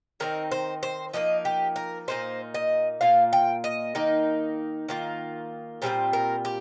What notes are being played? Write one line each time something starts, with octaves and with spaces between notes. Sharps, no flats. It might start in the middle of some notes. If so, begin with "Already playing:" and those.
D#3 C4 D#4 A#4
C5
C5
F3 A#3 D#4 D#5
G4
A#4
A#2 A#3 D#4 C5
D#5
A#2 A#3 F4 F5
G5
D#5
D#3 A#3 D#4
D#3 A#3 F4
A#2 G3 C4 F4 C5
A#4
G4